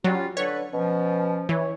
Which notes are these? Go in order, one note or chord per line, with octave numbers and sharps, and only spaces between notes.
F#3 G3 C#4 F4
D3 A4 B4 C#5
B2 F3 C#4
E3 C#5